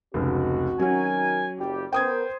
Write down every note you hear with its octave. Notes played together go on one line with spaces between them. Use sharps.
F1 C#2 C4 F#4
D#3 F#3 C#4 A#4 G#5
F#1 G3 G4
B3 A#4 C5 G5 D#6 G#6